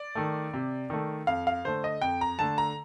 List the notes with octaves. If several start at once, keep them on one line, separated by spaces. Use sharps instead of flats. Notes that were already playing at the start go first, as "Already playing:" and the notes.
Already playing: D5
D#3 A3
C3
D#3 A3
F2 F5
F5
D3 A3 C5
D#5
F2 G5
A#5
D3 A3 A5
A#5